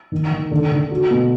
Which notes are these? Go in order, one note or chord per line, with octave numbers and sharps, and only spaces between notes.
D#3
D#3
D3
D3
F#4
B2